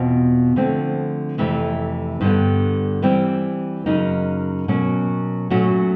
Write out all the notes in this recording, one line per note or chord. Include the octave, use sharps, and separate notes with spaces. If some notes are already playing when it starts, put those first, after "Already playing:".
Already playing: E2 B2 C4 F4
D3 F3 A3 C4
F2 C3 E3 A3
G2 D3 G3 B3
E3 G3 C4
F#2 C#3 F#3 A#3 D#4
B2 F#3 A#3 C#4
A#2 F#3 A3 C#4 F#4